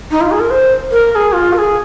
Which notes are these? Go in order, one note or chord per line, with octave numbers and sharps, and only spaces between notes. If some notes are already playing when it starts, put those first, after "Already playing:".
D#4
F4
G#4
A#4
C5
A#4
A#4
G#4
F4
A#4
G#4